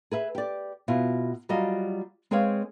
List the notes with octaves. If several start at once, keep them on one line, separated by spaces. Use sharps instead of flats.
G#4 B4 E5
G4 D5
B2 E4 F4
F#3 G3 F4 F#4 D#5
G#3 C4 G#4 B4 C#5 F5